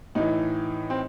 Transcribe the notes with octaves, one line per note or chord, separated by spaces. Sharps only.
A2 E3 D#4
C4